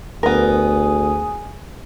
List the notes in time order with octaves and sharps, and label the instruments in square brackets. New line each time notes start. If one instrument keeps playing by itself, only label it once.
[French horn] D2 [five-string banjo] B3 A#4 [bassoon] G#4